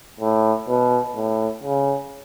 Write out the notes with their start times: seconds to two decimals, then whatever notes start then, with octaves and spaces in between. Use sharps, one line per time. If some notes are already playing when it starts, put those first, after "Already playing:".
0.20 A2
0.68 B2
1.15 A2
1.63 C#3